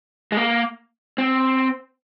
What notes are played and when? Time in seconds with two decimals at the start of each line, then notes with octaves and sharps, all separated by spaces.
0.32 G#3
0.37 A#3
1.18 C4